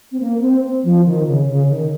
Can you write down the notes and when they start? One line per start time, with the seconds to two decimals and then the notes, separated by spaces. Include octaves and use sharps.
0.12 C4
0.20 A#3
0.41 C4
0.84 F3
1.05 D#3
1.27 C#3
1.48 C#3
1.69 D#3